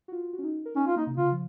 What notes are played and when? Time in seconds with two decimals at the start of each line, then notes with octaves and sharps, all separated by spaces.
0.08 F#4
0.12 F4
0.33 F#4
0.38 C#4
0.43 D#4
0.66 A#4
0.75 C#4 D#4
0.87 C#4 F4
0.96 A#3 D#4
1.07 C3
1.17 C#3 F4
1.32 F3